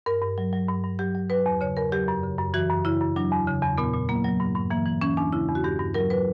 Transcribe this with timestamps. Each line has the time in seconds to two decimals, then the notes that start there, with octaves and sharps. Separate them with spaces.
0.06 G2 A#4
0.22 G2
0.38 F#3
0.53 F#3
0.68 G2
0.84 G2
0.99 F#3 G4
1.15 F#3
1.30 F#3 B4
1.46 E2
1.61 C#3 C#5
1.77 E2 A#4
1.92 F#3 G4
2.08 F#2
2.23 C#3
2.38 F#2
2.54 E3 F#4
2.70 F#2
2.85 C#3 E4
3.01 F#2
3.16 F#3 D4
3.31 E2
3.47 C#3
3.62 E2
3.78 A#2 B3
3.94 A#2
4.09 F#3 A#3
4.24 F#3
4.40 G2
4.56 G2
4.70 E3 A#3
4.86 E3
5.01 E3 C#4
5.17 E2 D4
5.33 C#3 E4
5.49 E2
5.55 F#4
5.64 G2 G4
5.79 G2
5.94 F#3 A#4
6.10 F#3 B4